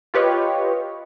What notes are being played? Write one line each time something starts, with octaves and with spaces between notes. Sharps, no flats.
F4 G4 B4 C#5 D#5